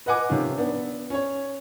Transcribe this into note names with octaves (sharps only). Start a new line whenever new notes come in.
B4 D#5 F#5 G#5 D6
C3 D#3 F3 C#4 F4
B3 D4
C#4 C#5